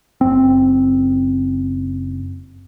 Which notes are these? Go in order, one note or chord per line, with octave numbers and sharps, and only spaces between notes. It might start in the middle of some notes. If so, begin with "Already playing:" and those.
F#1 C4